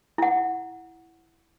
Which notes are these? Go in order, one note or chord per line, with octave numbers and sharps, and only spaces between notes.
E4 F#5